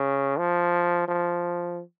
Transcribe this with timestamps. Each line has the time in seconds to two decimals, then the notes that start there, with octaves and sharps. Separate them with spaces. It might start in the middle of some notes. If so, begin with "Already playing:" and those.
Already playing: C#3
0.38 F3
1.08 F3